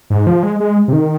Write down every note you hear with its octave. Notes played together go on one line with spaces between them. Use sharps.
G#2
F3
G#3
G#3
C3
D#3